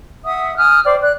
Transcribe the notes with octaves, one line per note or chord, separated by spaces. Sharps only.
E5 F#5 D#6
G#5 D#6 F6 F#6
C5 D5 G5 D6
D5 F#6